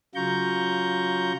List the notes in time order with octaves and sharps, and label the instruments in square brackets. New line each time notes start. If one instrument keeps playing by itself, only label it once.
[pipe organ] C#3 F#3 F4 A#5 C#6 G6